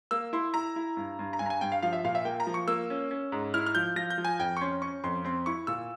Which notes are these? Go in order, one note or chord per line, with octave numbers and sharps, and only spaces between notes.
A#3 E6
E4 C6
E4 A#5
E4
G2
G2
A#5
G2 G#5
A#5
G#5
G2 G5
F5
F3 F5
E5
A#2 F5
E5
A#3 G5
A#5
F3
C#6
A#3 E6
C#4
C#4
G#2
E4 F6
F6
F3 G6
F3 A#6
G6
F3
G#5
F2 G5
C#6
C#4 C6
C#4 C#6
F2 C6
C4 C6
E4 C#6
A#2 E6